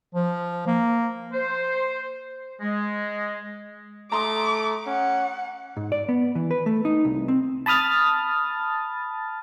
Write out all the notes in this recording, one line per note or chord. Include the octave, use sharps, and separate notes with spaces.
F3
A#3
C5
G#3
A3 A#5 C6 D6 D#6
C#4 F#5
G#2
D5
B3
E3
B4
A3
D#4
C2
C4
A5 B5 D#6 F6 A6